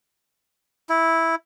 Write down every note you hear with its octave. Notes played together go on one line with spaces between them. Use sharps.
E4